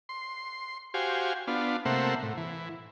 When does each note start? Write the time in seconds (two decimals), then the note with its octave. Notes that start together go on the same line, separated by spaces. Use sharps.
0.09 C6
0.94 F#4 G4 C5 F5 G#5
1.47 B3 D4 F4
1.85 C3 A3 A#3 C5 E5 F#5
2.22 A2
2.37 E3